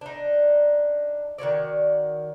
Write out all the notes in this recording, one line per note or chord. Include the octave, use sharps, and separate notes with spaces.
D4 D#4
D#3 F#4 C#5 D5